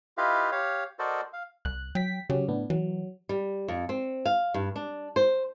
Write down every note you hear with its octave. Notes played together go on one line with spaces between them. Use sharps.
E4 F4 G4 B4 D#5 F5
G4 C#5 F5
F#4 A4 A#4 C5 D5 D#5
F5
C2 F#6
F#3 G5 B6
C#3 F#3 C#4 G4
A2 B3 D4
E3 F#3
G3
F2
C4
F5
G2
D4
C5